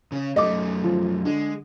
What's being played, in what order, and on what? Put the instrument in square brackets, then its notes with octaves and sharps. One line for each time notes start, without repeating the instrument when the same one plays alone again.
[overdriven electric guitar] C#3 C#4
[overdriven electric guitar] F#2 A3 [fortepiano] D#5 D6
[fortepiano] F3
[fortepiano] D3 [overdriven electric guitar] G#3